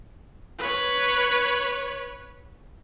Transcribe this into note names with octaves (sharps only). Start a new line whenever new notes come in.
B4 C#5